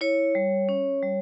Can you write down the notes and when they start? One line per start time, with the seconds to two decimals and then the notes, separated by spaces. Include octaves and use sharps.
0.01 E4 C#5
0.35 G3
0.69 C#4
1.03 G3